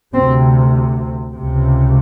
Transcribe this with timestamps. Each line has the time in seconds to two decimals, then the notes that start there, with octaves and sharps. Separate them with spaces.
0.14 D2 C3 C4
1.34 C#2 C3